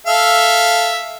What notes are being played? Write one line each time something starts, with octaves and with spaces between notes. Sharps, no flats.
A4 E5 F5